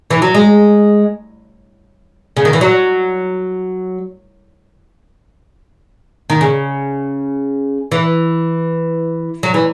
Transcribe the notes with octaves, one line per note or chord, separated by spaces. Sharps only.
E3
F#3
G#3
C#3
D#3
E3
F#3
D#3
C#3
E3
F#3
E3